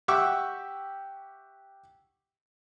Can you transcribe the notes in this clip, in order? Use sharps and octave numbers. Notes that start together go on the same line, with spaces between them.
G4 E5 F#5 C#6 D6 E6